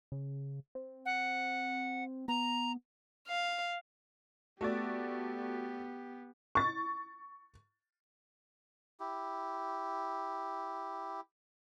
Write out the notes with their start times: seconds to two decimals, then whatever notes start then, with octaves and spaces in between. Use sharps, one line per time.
0.12 C#3
0.75 C4
1.05 F#5
2.28 B3 A#5
3.28 F5
4.61 A3 B3 F#4 G4 D5
6.55 C#6 A6
9.00 E4 G4